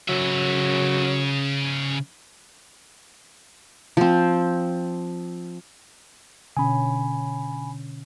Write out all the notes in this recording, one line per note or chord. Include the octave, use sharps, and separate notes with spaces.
C#3 F#3 E5
F3 C4
B2 D3 C#4 G#5 B5